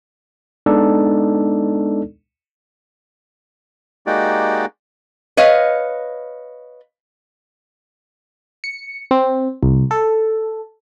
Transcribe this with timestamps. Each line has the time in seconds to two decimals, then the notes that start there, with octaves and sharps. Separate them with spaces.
0.66 G#3 B3 D4 D#4 A4 D5
4.07 G#3 A#3 D#4 F#4 G4 D5
5.37 B4 C#5 D#5 F5
8.64 C#7
9.11 C4
9.63 C2
9.91 A4